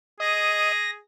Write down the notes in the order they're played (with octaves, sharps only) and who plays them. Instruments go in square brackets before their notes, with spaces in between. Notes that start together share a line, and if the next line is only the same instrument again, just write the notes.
[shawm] G#4 [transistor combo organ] D#5 [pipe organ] A#6